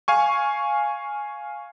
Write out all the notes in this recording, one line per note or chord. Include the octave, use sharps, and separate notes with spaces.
F5 G#5 C#6